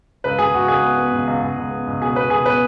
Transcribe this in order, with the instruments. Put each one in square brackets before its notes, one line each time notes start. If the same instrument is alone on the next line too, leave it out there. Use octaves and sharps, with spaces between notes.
[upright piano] C#2 B4
C#2 G#4
C#2 F#4
C#2 G#4
B3
B3
C#2
C#2
C#2
C#2
B3
C#2
B2 G#4
B3 B4
B2 G#4
B3 B4